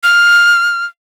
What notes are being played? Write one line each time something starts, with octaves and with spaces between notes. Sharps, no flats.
F6